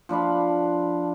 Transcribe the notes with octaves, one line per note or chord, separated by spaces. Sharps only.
F3 D4 B4 F5